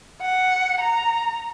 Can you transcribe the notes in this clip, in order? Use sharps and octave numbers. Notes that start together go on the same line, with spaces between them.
F#5
A#5